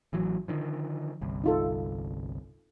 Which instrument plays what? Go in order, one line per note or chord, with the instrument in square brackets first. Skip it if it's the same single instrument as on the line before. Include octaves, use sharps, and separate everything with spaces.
[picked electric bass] A1 E3 F#3
D3 D#3 F3
G1 C2
[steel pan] D#4 F4 A4